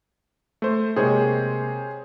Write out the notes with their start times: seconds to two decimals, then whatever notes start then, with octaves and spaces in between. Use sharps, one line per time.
0.62 A3 C5
0.96 C3 G#3 A#3 G#4 C5 C#5